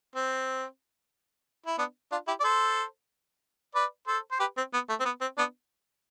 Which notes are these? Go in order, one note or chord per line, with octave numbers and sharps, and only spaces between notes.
C4
E4
B3 D4
D4 F4
E4 G4
D5
A4 C5
B4 D5
A4 C5
C5
G4 B4
C4
B3
A3
C4
B3
C4
B3 D4